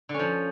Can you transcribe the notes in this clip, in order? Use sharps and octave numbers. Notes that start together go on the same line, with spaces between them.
D3
C#4
F3